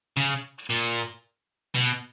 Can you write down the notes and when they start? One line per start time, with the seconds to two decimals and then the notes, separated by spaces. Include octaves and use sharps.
0.17 C#3
0.70 A#2
1.75 B2